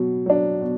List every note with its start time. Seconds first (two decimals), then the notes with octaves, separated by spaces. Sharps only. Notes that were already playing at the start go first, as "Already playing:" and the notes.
Already playing: B2 F#3
0.26 F#3 D4
0.61 B2